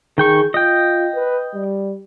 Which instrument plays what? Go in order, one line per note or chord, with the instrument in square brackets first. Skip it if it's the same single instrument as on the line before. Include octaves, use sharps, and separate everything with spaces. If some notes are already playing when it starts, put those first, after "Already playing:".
[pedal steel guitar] D#3 G5 C#6 [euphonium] G#4
[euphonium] F4 [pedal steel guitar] D#5 G5
[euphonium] B4
G3